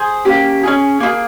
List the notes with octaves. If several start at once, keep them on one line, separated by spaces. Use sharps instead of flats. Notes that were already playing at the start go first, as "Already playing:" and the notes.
Already playing: G#4 C5
A#3 C#4 G4
C#4 F4 G#4
A#3 F4 G#4